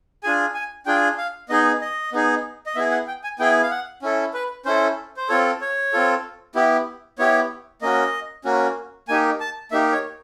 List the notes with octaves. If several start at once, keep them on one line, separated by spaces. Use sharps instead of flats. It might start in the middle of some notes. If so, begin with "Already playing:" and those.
D4 F4 G#4 G#5
G#5
D4 F4 G#4 G5
F5
B3 D#4 G#4 D#5
D#5
B3 D#4 G#4
D#5
B3 E4 G#4 E5
F#5
G5
G#5
B3 E4 G#4 G5
F5
F#5
C#4 E4 A4
B4
C#4 E4 A4 C5
C5
C4 F4 A4 C#5
C#5
C4 F4 A4
B3 E4 G4
B3 E4 G4 C#5
A#3 C#4 F#4 D#5
A#3 C#4 F#4
A#3 D#4 G4 G#5
A5
A#3 D#4 G4 E5
C#5